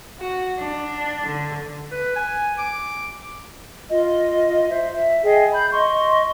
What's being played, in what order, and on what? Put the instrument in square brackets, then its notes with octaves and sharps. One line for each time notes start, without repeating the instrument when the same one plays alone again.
[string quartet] F#4
D4
D3
[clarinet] B4
G#5
D6
[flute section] F4 D#5
C5 E5
E5
G#4 D#5 G5
B5 G6
D#5 C6 C#6